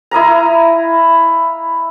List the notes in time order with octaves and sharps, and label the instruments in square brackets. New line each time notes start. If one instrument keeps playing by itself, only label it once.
[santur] E4 D#5 F5 A#5